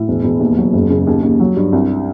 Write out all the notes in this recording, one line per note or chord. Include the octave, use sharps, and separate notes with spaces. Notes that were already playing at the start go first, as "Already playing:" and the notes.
Already playing: A2
E1
E1
D#2
F#3
F#1
C#3
D#2
D#2
F#3
G2
C2